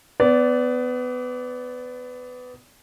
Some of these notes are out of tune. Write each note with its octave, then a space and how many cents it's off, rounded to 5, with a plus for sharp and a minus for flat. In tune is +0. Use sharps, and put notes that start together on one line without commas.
B3 +20 D5 -20